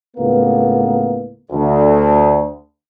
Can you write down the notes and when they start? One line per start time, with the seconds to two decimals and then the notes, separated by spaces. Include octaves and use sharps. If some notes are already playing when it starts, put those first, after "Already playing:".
0.17 C#2 A2 A#3 B3
1.51 D2